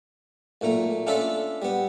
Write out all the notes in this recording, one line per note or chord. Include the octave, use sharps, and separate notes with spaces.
B1 A#2 A3 A#5
C#4 D4 F4 A4 D5 E5
G3 B3